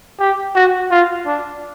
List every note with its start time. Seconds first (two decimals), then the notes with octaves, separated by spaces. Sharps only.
0.20 G4
0.55 F#4
0.91 F4
1.26 D4